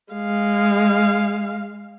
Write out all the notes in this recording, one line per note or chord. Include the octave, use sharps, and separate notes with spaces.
G#3 F5